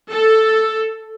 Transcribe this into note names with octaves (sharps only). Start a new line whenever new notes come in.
A4